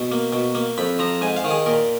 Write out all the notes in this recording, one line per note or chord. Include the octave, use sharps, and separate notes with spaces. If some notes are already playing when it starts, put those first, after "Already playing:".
Already playing: B2
A#3
B2
A#3
F2 B5
F3 A#5
G#2 G#5
F5
D#3
G#4
A#2 A#4